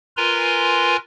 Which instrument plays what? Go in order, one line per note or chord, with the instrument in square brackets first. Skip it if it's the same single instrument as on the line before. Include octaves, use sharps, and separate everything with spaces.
[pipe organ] F4 A#4 B4 G#5 A#5 C6